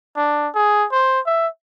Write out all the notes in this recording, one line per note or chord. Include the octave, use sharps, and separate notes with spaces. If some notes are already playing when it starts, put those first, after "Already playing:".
D4
G#4
C5
E5